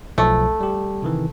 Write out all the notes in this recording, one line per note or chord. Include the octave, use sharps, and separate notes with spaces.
B1 F3 A3
G3 G4
C3 D#3 E3